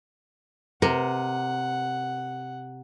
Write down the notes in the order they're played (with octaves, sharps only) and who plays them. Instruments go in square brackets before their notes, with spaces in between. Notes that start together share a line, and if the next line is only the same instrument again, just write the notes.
[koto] C3 [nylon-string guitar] A#4 [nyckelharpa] F#5